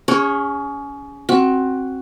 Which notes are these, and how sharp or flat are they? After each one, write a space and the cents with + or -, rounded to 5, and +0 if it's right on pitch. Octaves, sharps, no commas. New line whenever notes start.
C#4 +25 G#4 -30 C#5 -5
C4 +20 F#4 +5